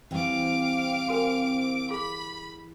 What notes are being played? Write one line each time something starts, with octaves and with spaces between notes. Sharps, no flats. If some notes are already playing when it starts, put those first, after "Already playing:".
E3 G3 C4 F5 D6
F#4 A#4 G#5
G#4 B5